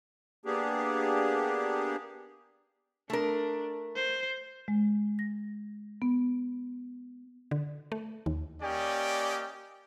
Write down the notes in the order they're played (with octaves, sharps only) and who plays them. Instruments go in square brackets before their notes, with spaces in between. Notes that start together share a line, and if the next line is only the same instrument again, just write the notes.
[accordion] A#3 B3 D4 G4 G#4
[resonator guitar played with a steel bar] A3 A#4 [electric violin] D4
[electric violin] C5
[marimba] G#3
A#6
B3
[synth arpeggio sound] D3
A3
D#2
[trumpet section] A#3 C#4 G4 D5 D#5 G5